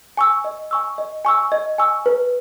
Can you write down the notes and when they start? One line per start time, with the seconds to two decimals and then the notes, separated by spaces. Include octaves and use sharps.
0.17 G#5 C#6 E6
0.44 D#5
0.71 G#5 C#6 E6
0.98 D#5
1.25 G#5 C#6 E6
1.52 D#5
1.78 G#5 C#6 E6
2.06 B4